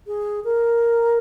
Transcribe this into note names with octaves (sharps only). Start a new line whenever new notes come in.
G#4
A#4